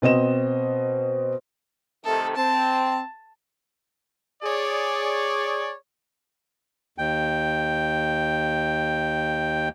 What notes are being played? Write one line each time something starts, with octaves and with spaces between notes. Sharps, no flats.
B2 C4 D#5 E7
C3 D#3 A3 A4
C4 A5
G#4 C#5 D5
D#2 G5